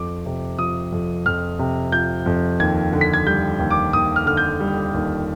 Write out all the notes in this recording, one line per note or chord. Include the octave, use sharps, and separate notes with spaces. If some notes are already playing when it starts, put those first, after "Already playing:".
Already playing: F2 D6
C3
F3 D#6
F2
F2 F6
C3
F3 G6
F2
D#2 G#6
D3
B6
G#6
G3 G6
D#2
D6
D#2 D#6
F6
D3 F6
G6
G3
D#2